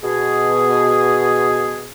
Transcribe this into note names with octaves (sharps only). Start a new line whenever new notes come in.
B2 G#4